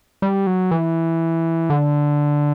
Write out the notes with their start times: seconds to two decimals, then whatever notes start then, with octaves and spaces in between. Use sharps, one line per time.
0.22 G3
0.47 F#3
0.71 E3
1.70 D3